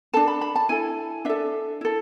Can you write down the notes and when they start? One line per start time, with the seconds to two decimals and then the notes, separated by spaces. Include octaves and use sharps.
0.13 D4 A4 A5
0.28 B5
0.41 B5
0.56 A5
0.69 E4 A4 G#5
1.25 D4 A4 E5
1.81 E4 A4